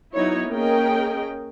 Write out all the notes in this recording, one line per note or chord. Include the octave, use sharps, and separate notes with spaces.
F#3 B3 D#4 E4 C#5
A#3 C#4 G#4 A#4 D#5 G5